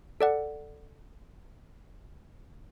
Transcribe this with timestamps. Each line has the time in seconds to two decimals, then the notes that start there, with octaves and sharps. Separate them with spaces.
0.21 A4 D5 F#5